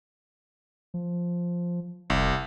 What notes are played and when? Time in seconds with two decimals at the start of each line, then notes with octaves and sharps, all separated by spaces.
0.94 F3
2.10 F1 C2